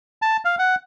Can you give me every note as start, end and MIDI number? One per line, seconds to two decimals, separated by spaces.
0.22 0.37 81
0.45 0.55 77
0.59 0.75 78